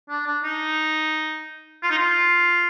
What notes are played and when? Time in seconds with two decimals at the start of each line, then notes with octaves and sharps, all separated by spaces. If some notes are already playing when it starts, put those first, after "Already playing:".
0.10 D4
0.26 D4
0.44 D#4
1.83 F4
1.90 D#4
1.98 F4